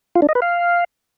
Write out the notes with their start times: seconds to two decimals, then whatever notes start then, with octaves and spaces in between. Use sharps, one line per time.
0.15 F4
0.22 D4
0.29 D#5
0.35 B4
0.42 F5